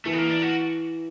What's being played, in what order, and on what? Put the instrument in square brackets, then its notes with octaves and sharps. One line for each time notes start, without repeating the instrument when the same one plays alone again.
[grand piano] E3 [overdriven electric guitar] A3
[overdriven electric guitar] B3
A#3
D4
F#4